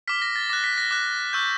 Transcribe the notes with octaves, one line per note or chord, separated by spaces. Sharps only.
D6 F6 B6
A#6
A6
D6 F#6 A#6
B6
A#6
D6 F#6
C#6 E6 G6